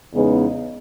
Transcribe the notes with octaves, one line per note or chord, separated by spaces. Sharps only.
E2 C#3 G#3 B3 D#4